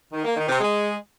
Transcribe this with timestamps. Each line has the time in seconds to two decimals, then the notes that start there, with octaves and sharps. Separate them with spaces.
0.13 D#3
0.24 A#3
0.36 D#3
0.48 C3
0.60 G#3